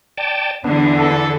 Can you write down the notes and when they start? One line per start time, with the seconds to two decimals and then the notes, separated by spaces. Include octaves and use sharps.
0.18 D5 G5 A5
0.64 E2 D3 E3 B3 D4
0.97 A4